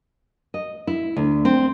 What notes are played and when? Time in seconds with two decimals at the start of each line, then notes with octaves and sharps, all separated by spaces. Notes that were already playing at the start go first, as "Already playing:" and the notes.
0.54 D#5
0.87 E4
1.16 D2
1.45 C4